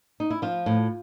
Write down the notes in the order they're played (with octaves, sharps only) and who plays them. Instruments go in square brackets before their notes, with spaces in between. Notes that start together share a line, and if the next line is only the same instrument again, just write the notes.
[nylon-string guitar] D#4
E4
F3 F4
A2